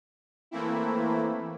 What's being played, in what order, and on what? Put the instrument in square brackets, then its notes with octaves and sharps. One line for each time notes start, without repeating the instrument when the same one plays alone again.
[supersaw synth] E3 A3 A#3 C4 E4